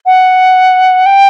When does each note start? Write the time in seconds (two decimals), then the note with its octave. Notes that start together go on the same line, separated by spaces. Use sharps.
0.06 F#5
1.06 G5